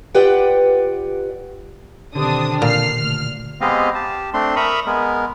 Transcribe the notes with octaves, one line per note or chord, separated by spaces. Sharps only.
F4 G4 B4 D5 F#5 G5
B2 D3 D#3 C4 D4 G4 D#6
A#2 F6 C7
D3 A3 F6
G#3 B3 C4 G4 D#5 F5
G4 A5
A3 C4 D4 C6
A#4 E5 A#5 B5 C#6 D#6
G#3 B3 A#4